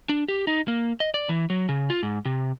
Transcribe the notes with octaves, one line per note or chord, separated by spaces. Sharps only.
D4
G4
D#4
A#3
D#5
D5
E3
F#3
C#3
F4
G#2
C3